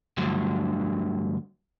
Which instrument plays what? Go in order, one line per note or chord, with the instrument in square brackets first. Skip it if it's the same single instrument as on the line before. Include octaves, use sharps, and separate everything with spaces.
[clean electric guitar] D2 G2 D3 F3 F#3